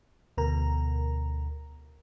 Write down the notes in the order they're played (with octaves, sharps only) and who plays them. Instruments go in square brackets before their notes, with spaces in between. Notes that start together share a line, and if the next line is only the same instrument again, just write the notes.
[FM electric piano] D2 B2 A#4 A#5